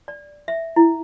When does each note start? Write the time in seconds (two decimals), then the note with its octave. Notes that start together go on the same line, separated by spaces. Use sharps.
0.08 D5
0.48 E5
0.76 E4